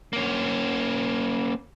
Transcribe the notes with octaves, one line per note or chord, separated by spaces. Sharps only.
A#3 C#4